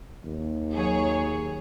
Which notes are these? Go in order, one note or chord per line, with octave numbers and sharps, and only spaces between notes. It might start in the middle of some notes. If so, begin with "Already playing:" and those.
D#2
F#3 G#4 C#5